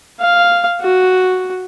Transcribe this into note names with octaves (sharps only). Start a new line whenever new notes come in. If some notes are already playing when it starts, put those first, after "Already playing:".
F5
F#4